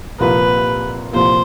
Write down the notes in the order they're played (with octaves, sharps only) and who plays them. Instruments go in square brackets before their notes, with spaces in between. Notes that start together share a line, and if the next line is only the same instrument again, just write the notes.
[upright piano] C2 A#2 F3 A#3 [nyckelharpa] B4
[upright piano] C2 A#2 F3 A#3 [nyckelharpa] C5